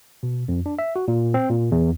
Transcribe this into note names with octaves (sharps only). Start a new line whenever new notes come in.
B2
F2
D4
E5
F#4
A#2
C4
A#2
E2